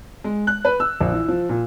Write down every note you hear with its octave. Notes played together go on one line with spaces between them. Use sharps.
G#3
F#6
B4
E6
A#1
E3
F3
A#2